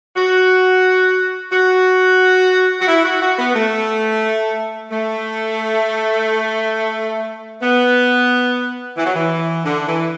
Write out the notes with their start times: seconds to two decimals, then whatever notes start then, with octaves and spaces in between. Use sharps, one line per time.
0.17 F#4
1.52 F#4
2.81 F#4
2.88 E4
3.05 F#4
3.21 F#4
3.39 B3
3.55 A3
4.91 A3
7.62 B3
8.97 E3
9.06 F#3
9.15 E3
9.65 D3
9.88 E3